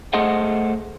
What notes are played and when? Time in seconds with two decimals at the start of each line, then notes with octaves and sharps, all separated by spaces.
0.13 A3 G#4 A4 C5 D#5 F#5